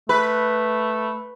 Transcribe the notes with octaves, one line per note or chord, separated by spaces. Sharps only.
A3 B4